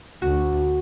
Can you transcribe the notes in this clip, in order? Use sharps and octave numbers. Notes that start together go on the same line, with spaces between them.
D2 F#4